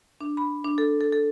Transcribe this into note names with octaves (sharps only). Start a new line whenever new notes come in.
D4
B5
D4
A4
A4
A4